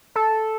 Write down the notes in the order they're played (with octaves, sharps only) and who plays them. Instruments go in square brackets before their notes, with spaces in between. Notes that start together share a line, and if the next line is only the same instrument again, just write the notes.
[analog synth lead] A4